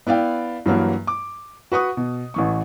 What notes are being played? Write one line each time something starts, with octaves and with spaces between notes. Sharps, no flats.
B3 E4 D5 F5 G5
G2 E3 F#3 A#3
D6
F#4 B4 C#6 D#6
B2
A1 E3 C#6